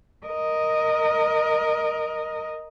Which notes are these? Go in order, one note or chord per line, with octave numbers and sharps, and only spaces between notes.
A#4 D#5